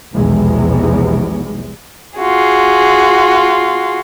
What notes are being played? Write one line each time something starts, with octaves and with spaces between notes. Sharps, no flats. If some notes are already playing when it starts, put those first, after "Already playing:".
F1 B1 E2 C3 G#3
F4 F#4 G#4